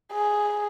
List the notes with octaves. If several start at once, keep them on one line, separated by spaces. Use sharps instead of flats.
G#4